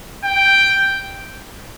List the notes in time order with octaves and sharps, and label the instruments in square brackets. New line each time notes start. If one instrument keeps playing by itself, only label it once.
[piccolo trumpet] G5